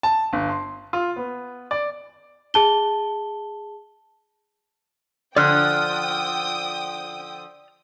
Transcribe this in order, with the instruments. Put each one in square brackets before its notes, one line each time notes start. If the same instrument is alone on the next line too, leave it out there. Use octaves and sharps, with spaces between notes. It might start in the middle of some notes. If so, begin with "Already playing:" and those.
[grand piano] A5
G1
C6
F4
B3
D5
[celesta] G#4 A5 G7
[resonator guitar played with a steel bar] D3 F3 [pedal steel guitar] D5 F6 F#6 [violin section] G5 D#6